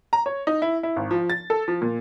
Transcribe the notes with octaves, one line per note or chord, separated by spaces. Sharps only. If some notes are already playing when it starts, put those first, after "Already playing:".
A#5
C#5
D#4
E4
E4
G#1
F3
A6
A4
F3
A#2